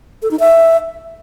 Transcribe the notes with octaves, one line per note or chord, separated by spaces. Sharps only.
A4
D#4
E5